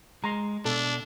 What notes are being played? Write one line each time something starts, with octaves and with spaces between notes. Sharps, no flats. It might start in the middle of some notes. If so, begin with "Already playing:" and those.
G#3 A#5 C6
B2 D4 A4